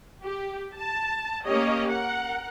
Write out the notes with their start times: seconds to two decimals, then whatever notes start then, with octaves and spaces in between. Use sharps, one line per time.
0.22 G4
0.76 A5
1.46 A#3 C#4 G4 C#5 D#5
1.90 A#4 F#5